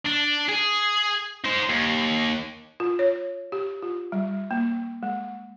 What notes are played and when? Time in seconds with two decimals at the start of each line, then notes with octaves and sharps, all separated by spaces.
0.06 D4
0.49 G#4
1.45 D#4 C5
1.69 D#2
2.80 F4
2.99 C#5
3.52 G4
3.82 F4
4.12 G3
4.51 A#3
5.03 G#3